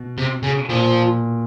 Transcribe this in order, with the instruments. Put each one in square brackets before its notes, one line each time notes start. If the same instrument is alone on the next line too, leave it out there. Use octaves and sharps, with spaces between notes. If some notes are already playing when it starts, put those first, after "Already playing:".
Already playing: [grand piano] B2
[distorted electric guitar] C3
C#3
[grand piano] A#2 [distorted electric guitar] F3